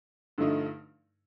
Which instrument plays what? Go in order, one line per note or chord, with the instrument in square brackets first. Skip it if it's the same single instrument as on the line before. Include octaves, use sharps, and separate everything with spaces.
[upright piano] G2 D3 F3 A3 D#4